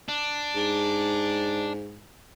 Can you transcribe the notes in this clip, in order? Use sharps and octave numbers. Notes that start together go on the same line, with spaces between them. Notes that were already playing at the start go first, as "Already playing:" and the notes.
D4
G#2